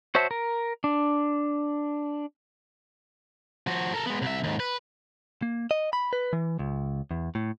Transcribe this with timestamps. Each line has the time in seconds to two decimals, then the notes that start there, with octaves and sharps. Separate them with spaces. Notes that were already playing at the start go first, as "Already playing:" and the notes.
0.15 F#4 C5 C#5 E5 A5
0.31 A#4
0.84 D4
3.67 F3 F#4
3.94 A4 A#4
4.06 G#3 B3
4.22 C2 E5
4.44 D#2 G#2
4.60 B4
5.42 A#3
5.71 D#5
5.93 B5
6.13 B4
6.33 E3
6.59 C#2
7.11 E2
7.35 A2